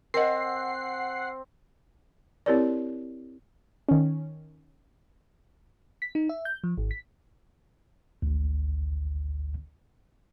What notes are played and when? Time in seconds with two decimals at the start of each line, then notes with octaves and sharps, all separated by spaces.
0.14 C4 A#4 D#5 F#5 C7
2.46 C4 E4 G4 A#4 C#5 D5
3.89 D#3 C#4
6.02 B6
6.15 D#4
6.29 E5
6.45 G6
6.64 F3
6.78 G#1
6.91 B6
8.22 G#1 D2